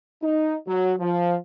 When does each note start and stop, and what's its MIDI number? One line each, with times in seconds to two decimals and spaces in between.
0.22 0.55 63
0.66 0.94 54
1.00 1.35 53